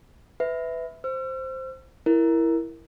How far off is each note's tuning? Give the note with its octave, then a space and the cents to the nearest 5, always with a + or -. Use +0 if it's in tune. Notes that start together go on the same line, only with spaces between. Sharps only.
B4 +20 E5 -10
C5 +0 E6 +45
E4 +5 A#4 +0